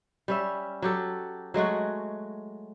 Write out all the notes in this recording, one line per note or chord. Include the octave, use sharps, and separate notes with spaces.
G3 C#4 E5
F#3 G4 A4
F#3 G#3 A3 F#4